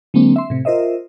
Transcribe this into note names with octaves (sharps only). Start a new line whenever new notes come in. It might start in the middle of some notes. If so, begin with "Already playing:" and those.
D3 F#3 G#3 A#3 C4 D4
E5 C6
A2 C3
F4 A#4 C5 D#5 E5